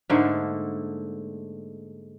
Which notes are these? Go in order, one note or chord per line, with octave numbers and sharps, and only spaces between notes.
G#2 D3 A3 A#3